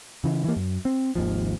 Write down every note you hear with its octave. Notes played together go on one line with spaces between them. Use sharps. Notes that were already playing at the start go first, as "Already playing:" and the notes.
C#3 E3
E3 A#3
F#2
C4
G#1 D#2 F3